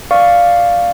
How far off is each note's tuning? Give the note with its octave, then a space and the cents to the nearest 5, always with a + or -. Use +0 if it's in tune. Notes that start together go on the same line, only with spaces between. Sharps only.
D5 +0 F5 +0 C#6 +0